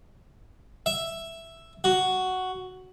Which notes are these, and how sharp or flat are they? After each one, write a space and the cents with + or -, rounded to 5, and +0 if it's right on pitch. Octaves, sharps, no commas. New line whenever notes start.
E5 +5
F#4 +5